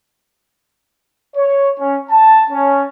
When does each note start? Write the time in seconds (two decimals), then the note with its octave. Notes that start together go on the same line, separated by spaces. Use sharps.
1.36 C#5
1.79 C#4
2.10 A5
2.51 C#4